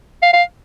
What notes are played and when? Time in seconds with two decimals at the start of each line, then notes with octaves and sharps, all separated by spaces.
0.22 F5
0.33 F5